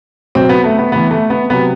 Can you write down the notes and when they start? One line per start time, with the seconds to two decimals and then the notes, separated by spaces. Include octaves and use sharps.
0.35 B2 F#3 C4
0.49 B3
0.64 A3
0.78 B3
0.92 A2 E3 B3
1.11 A3
1.30 B3
1.50 C3 F#3 B3